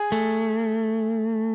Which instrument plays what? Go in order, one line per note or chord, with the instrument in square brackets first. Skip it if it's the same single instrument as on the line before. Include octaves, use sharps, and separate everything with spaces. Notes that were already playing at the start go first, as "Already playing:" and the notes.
Already playing: [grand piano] G#4
[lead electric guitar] A3